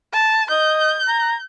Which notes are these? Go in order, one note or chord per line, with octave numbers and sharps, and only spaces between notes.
A5
D#5 G6
A#5